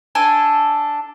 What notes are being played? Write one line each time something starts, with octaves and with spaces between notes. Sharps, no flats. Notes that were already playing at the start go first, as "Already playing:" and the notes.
D4 A4 G#5